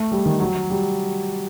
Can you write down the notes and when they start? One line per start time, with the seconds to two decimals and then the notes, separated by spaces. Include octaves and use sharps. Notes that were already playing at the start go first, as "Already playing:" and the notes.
Already playing: A3
0.11 G3
0.26 D#3
0.40 F#3
0.70 G3